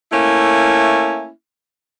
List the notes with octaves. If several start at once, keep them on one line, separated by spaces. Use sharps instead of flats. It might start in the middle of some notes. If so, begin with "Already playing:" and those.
A3 A#3 C#4 E4